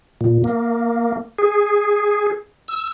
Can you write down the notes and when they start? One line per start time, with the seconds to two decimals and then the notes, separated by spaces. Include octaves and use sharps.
0.21 A#2
0.44 A#3
1.39 G#4
2.68 E6